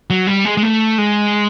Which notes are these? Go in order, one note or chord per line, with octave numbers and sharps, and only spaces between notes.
F#3
G3
G#3
G#3
A3
G#3